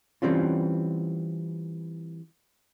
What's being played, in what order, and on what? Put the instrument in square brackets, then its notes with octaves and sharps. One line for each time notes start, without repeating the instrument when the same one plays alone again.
[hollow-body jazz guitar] E3 G3 C4 C#4 F4